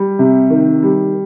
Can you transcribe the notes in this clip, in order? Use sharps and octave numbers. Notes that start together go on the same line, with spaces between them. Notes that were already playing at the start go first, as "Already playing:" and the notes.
Already playing: G3
C3
D#3
G3